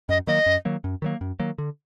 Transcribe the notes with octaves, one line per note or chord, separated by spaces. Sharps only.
F#2 D#5
D#3 F#3 A#3 D#5
F#2
D#3 F#3 A#3
F#2
D#3 F#3 A#3
F#2
D#3 F#3 A#3
D3